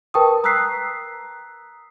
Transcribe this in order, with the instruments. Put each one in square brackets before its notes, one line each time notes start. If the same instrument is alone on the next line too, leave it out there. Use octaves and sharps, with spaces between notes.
[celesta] A#4 B4 G5 A5 C#6 D#6
A#5 D#6 E6 F#6 B6 C7